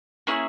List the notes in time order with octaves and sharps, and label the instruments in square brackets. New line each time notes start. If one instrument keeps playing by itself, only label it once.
[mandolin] A#3 C#4 E4 G#4